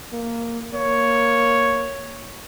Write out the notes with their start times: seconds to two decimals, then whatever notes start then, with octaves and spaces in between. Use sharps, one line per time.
0.13 A#3
0.74 A#3 C#5